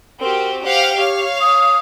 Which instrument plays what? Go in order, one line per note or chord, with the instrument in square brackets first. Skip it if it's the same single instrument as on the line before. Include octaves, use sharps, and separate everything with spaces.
[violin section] C4 F#4 G4 [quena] A#4
[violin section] G4 F5 F#5 [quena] C5
[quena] G4 [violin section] C#5 F5
[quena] D#6